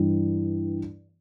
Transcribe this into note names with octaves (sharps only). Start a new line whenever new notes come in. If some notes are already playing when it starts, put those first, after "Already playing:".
Already playing: G2 E3 G3